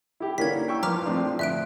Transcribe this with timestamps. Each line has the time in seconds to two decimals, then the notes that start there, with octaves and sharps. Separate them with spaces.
0.20 E4 G4
0.38 D3 E3 A#3 C#4 D4 A#4 G#6 B6
0.68 G5 C#6 E6
0.83 F3 B4 A#5 D6 F6
1.06 A2 C4 D4
1.39 D2 E5 F#6 D7